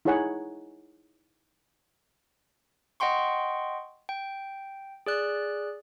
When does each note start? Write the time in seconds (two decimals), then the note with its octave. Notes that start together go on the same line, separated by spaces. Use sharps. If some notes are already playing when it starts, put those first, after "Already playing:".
0.05 D#4 E4 G#4 C#5 F#5 G#5
3.00 D#5 F#5 G5 C6 C#6
4.09 G5
5.06 G#4 D5 F#6